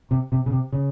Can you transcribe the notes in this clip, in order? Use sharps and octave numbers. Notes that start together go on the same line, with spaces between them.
C3
C3
C#3
C3
C#3